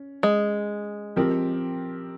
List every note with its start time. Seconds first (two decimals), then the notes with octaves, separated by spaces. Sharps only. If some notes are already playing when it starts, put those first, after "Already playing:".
Already playing: C#4
0.23 G#3
1.16 F3 C4 G4 A#4